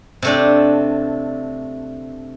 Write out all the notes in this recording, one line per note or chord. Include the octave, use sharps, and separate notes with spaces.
C3 A3 D4